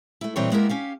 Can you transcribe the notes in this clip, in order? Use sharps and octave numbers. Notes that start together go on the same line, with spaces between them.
A3 E4
A#2 E3 G3 C4 C#5
G#3 A#3 B3 E4 G4 A#4
C#4 G4 F5